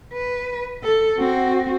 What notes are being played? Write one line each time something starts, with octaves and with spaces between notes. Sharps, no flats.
B4
A4
C4 F#4